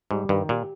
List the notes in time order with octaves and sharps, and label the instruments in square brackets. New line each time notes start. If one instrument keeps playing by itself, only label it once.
[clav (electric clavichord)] G#2 [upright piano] G3
[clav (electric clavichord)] G2 [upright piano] D#3
[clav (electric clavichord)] A#2 [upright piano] G4